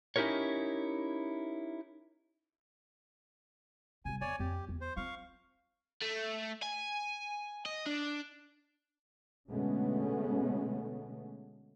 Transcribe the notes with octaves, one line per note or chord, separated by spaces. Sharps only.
C#4 D#4 E4 G4 A#4 C#5
C3 G3 G#5
E2 C#5 D5 G#5
F2 G4
E2
C5
C4 F4 F5 C#6
A3
G#5
D#5
D4
B2 D3 G#3 A3 B3 C#4